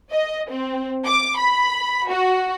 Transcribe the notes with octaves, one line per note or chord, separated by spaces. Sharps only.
D#5
C4
D6
B5
F#4